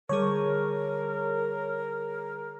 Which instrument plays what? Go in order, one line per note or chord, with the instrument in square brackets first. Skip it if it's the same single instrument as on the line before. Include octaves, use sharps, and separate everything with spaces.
[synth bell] D3 G3 G#4 [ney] A#4 [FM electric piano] C#5